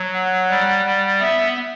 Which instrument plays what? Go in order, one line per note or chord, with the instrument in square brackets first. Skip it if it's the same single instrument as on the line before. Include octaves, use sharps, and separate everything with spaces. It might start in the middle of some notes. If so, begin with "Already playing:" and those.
Already playing: [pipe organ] F#3
[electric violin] F#5
[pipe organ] G3
G3
[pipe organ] B3 [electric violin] E5